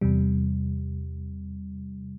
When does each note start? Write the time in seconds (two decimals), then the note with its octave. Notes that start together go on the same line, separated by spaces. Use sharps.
0.01 E2 C3 G3